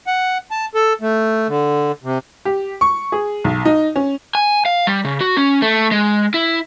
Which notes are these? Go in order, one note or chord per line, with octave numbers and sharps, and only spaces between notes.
F#5
A5
A4
A3
D3
C3
G4
C#6
G#4
B1
D#4
C#4
G#5
F5
G3
C#3
F#4
C#4
A3
G#3
E4